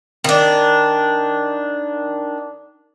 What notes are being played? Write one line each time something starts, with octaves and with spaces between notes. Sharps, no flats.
D#3 D4